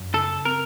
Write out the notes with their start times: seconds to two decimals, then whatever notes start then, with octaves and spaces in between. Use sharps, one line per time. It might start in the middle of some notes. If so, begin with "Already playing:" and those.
Already playing: F#2
0.14 C#3 A4
0.45 C4 A#4